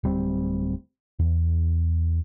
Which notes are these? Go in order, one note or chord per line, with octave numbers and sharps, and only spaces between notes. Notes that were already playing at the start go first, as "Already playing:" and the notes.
D1 G3 C4
E2